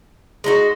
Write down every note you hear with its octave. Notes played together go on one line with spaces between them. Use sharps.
G#3 D#4 F#4